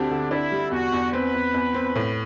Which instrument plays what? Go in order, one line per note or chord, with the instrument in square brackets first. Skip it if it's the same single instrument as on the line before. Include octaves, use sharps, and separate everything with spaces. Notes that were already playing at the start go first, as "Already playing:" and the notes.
Already playing: [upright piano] D2 D3 C4 G4 [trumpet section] D4
[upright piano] D3
[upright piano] D4 [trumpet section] E4
[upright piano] G3
[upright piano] E2 [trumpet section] F#4
[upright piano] E2
[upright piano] C4 [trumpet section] B4
[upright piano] E2
E2
C4
A2